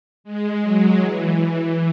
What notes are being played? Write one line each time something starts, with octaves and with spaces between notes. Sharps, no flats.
G#3
F#3
E3